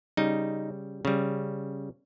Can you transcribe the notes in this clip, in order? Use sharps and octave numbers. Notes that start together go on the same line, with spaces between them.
C#3 G3 D#4
C#3 G3